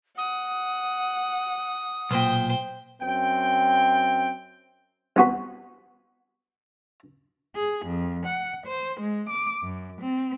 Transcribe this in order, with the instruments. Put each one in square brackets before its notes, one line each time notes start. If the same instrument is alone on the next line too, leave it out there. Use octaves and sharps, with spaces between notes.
[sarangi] F#5 [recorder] D#6
[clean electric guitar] B1 A#2 [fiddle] C5 G5
[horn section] F#2 C4 G5
[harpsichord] C2 B3 F#4 B5
[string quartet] G#4
F2
F#5
C5
G#3
D6
F#2
C4